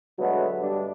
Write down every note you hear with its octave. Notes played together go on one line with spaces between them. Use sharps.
B2 D3 F#3 G#3 A3 B3
G2 G3 D4